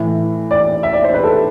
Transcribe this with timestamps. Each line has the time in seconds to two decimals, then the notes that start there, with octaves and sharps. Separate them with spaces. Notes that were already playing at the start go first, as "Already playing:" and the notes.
Already playing: A2 E3
0.51 D5
0.83 E5
0.93 D5
1.04 C5
1.14 B4
1.24 A4